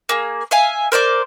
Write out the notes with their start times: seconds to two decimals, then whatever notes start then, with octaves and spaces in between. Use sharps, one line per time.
0.09 A#3 G#4
0.51 E5 F5 G#5
0.92 A#4 C5 D5 D6